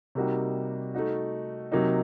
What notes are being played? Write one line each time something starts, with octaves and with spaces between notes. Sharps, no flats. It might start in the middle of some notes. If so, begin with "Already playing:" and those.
C3 G3 A#3 D#4 F#4
A3 D#4 F#4
C3 F#3 A#3 D#4